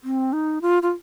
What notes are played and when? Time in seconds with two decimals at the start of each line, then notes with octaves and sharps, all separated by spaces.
0.04 C4
0.33 D#4
0.62 F4
0.83 F4